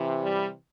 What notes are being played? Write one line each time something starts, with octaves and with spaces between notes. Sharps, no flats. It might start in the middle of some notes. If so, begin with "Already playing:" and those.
Already playing: C3 E3
G3